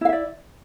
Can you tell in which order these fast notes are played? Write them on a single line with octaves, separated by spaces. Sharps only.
E4 F5 E5 D5